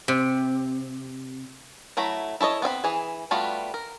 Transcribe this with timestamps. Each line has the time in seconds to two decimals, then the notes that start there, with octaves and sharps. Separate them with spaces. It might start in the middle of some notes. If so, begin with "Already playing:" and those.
0.08 C3
1.97 F#3 A3 E4 A#5 B5
2.41 E4 A4 C#5 D#5
2.62 B3 C4 E5 B5
2.84 E3 G#4
3.31 G3 A3 B3 F4 F#4
3.74 A#4